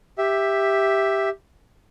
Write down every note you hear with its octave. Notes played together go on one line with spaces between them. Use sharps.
G4 E5